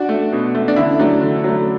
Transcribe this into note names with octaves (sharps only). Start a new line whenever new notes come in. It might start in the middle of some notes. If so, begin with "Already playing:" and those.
Already playing: D4 F#4
A3
B2
A3
D4
D3 E4
F#3 A3 D4
D3
F#3 A3